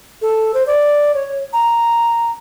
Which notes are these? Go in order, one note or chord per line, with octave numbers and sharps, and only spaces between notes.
A4
C5
D5
C#5
A#5